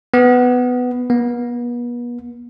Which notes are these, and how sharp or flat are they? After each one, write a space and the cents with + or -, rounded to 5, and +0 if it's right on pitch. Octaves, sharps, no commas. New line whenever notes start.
B3 +10
B3 -40